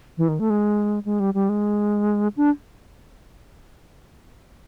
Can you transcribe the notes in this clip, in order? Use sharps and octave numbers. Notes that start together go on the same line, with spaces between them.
E3
D#3
A3
G#3
G#3
G3
G3
G#3
D4